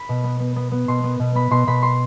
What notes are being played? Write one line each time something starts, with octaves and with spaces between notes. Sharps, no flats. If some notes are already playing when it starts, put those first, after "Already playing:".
Already playing: B5
B2
B3
B3
B3
B3
B2 C6
B3
B2
B3 B5
B2 C6
B2 B5
C6